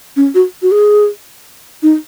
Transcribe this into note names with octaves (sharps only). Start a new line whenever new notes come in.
C#4
F#4
F#4
G#4
D#4